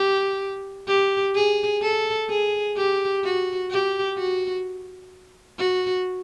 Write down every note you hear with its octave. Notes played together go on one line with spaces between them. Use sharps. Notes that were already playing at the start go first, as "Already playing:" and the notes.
Already playing: G4
G4
G#4
A4
G#4
G4
F#4
G4
F#4
F#4